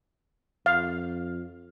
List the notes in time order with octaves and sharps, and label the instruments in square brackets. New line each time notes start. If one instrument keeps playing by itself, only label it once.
[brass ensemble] F2 [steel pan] F5